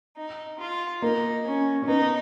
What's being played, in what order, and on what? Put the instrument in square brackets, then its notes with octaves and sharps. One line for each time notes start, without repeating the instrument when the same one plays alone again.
[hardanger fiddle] D#4
F4
[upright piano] A#3 [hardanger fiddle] D#4
[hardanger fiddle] C#4
[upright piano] C#4
[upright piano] B3 [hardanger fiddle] D#4